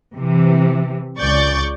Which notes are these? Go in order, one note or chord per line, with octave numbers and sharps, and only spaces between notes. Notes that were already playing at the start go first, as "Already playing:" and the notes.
C3 E3
C#2 D5 C#6 G6 A6